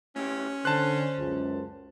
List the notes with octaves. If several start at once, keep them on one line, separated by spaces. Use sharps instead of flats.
A2 C#4 E4 G4
D3 C5 A5 F#6
C#2 F#2